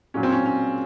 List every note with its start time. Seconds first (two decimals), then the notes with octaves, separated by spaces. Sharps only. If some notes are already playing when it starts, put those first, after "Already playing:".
0.14 A#2 F#3 C#4
0.23 C4
0.32 C#4
0.46 C#4